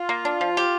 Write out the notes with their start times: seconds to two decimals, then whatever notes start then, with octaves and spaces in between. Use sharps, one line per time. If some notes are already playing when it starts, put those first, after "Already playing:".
Already playing: F4
0.09 A#3
0.25 D4
0.41 F3
0.57 G4